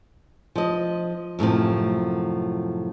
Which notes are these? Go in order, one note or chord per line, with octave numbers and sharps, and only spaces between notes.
F3 D#5
F#2 A2 C3 F3